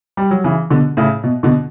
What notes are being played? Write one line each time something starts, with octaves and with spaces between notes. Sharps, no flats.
G3
F#3
C#3 E3
B2 D3
A2 C#3
B2
B2 D3